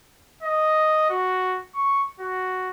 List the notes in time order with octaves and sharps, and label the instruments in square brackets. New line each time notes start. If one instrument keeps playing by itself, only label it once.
[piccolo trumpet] D#5
F#4
C#6
F#4